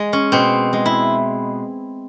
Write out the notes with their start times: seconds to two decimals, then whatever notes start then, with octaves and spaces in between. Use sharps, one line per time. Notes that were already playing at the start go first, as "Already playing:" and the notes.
Already playing: G#3
0.13 C#4
0.32 B2 C4
0.73 G#3
0.86 E4